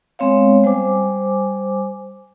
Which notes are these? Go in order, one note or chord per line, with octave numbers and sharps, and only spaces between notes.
G#3 B3 C4 C#5 F5
G3 C5 G#5 D6